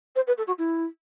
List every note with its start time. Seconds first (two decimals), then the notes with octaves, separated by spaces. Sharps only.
0.15 C5
0.27 B4
0.37 A4
0.47 F#4
0.58 E4